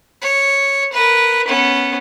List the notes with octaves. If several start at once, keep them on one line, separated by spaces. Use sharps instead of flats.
C#5
A#4 B4
B3 C#4